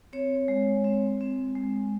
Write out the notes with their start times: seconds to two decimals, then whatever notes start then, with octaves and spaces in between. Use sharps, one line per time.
0.13 C4 C#5
0.48 G#3
0.84 C4
1.21 C4
1.55 G#3